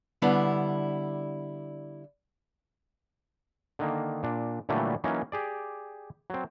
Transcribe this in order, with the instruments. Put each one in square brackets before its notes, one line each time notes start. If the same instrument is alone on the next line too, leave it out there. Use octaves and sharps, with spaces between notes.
[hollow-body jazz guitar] D3 G3 B3 D4 E4
[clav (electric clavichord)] D3 D#3 A#3
A#2 D4
A#2 D3 E3 F#3 G3 A3
E3 F#3 A#3 C#4 D#4
G4 G#4 D5
F#3 C4